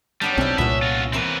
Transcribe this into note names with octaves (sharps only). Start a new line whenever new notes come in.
F#3 G3 B3 D4
B1 C4 D4 E4
C2 A#2 B3 C#4 E5
F4 F#4
E3 C4 A#4 B4